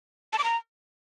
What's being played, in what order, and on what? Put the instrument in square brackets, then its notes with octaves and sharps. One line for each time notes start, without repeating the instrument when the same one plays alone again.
[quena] A5
D6
A#5